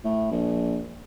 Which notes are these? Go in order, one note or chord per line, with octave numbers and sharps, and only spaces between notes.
A2
A#1